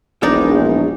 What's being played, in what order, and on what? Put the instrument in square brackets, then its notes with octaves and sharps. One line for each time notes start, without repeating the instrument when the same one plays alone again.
[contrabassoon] E1 [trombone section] A#1 [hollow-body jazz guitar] G#3 D#4 D5